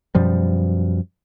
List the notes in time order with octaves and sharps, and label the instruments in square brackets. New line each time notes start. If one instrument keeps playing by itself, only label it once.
[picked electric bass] F#2 B2 F3 G3